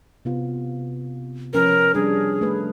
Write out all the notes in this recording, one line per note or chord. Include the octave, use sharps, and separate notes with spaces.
C3 B3 F4
F3 C#4 A#4 B4
G3 D4 G#4
A3 B4